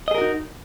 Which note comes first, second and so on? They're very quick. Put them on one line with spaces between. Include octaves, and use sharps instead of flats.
D#5 G#4 A#4 F#4 D#4